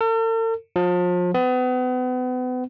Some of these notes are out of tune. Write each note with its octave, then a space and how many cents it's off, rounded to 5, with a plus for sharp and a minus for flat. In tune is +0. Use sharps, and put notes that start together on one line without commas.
A4 +45
F3 +35
B3 +35